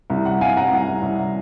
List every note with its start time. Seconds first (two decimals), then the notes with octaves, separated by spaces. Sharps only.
0.10 C2
0.25 F#5
0.41 C2 F5 G#5
0.57 F#5 A#5
0.71 C2 F#5
1.02 C2